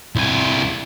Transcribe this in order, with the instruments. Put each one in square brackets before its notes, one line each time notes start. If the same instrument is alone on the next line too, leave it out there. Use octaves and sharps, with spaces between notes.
[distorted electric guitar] C2 G#5